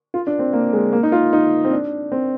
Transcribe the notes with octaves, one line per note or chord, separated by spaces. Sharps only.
F4
D4
C4
A#3
G#3
A#3
D#4
F4
D#4
C4
D4
C4